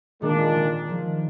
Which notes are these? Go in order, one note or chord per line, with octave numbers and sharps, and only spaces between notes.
A#2 D#3 G#3 D4
D#3
F3